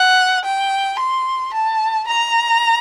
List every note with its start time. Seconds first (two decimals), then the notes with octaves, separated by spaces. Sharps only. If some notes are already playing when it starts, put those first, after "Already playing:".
Already playing: F#5
0.44 G5
0.99 C6
1.53 A5
2.07 A#5